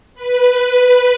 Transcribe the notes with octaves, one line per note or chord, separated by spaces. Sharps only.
B4
B4